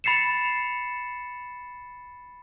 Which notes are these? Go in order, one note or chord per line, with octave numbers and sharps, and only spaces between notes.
B5 A6 C7 C#7 E7